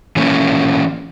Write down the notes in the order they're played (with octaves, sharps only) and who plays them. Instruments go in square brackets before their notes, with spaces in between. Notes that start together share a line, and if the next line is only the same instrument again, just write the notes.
[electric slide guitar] E3 A#3 C#4